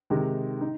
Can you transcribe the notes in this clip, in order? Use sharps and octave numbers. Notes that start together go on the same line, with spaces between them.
C3 D#3 G#3 D#4
D#4